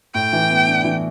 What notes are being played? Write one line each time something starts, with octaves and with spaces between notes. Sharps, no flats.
A2 G5
E3
B3
D4
E3